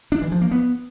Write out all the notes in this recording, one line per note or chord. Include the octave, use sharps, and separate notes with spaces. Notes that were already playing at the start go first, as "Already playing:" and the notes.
D4
E3
F3
A#3
B3